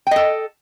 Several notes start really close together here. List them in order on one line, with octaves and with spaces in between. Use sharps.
G5 D#5 A4